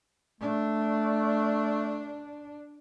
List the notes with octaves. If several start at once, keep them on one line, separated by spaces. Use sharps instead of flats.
A3 D4